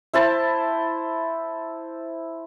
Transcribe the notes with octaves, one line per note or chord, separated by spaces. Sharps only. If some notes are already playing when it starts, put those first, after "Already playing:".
E4 C5 A5